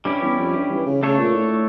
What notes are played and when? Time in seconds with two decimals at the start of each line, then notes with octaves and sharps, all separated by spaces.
0.05 G2 G3 C#4 E4 G4
0.22 E2
0.39 F2
0.55 G2
0.71 E3
0.86 C#3
1.02 C#3 A3 D4 A4 C#5
1.19 A#2
1.36 A2